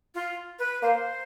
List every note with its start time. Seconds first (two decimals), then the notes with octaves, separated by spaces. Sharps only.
0.15 F4
0.59 B4
0.83 A#3 C5